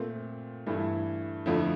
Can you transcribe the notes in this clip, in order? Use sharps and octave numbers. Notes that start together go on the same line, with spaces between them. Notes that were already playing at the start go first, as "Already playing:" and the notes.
Already playing: A#2 A3 C4
G2 E3 A3 E4
F2 D3 F3 A3 E4